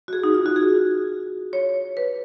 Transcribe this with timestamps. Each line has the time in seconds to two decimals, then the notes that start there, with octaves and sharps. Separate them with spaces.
0.08 F#4
0.13 G#4
0.24 D#4
0.34 F4
0.46 F#4
0.56 G#4
1.53 C#5
1.97 B4